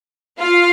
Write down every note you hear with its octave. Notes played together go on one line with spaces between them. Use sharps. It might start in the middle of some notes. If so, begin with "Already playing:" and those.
F4 F5